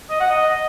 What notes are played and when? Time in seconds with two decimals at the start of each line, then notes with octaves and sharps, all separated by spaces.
0.10 D#5
0.20 F#5
0.30 D#5